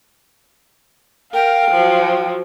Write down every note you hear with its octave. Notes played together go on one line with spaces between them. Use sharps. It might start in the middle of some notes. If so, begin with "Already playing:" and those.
A#4 F5 G5
F3 F#3